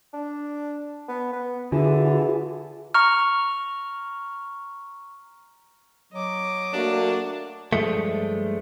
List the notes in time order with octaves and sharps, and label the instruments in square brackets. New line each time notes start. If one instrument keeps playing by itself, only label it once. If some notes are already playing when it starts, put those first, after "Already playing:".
[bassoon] D4
B3
B3
[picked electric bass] D3 [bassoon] E3 [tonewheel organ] F4 F#4 G#4
[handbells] A#5 C#6 F6
[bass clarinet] F#3 [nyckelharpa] D#5 D6
[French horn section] A3 A#3 F#4 [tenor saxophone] D4
[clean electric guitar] G2 F3 G#3 A3